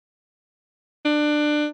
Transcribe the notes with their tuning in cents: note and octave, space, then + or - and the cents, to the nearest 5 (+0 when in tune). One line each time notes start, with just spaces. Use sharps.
D4 +20